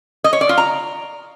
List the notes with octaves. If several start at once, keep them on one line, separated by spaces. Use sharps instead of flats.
D#5
C#5
D5
F4
A#5